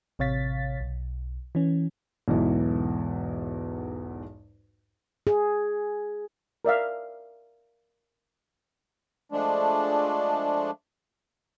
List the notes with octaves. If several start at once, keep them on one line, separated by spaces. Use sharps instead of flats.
A1 C3 C#5 F5 A6 B6
B1
E3 C#4
B1 E2 G#2 E3
G#4
A#4 D5 E5 F5
F3 G#3 A3 D4